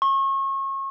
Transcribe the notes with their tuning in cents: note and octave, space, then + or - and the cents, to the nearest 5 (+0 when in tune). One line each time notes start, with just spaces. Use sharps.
C#6 -35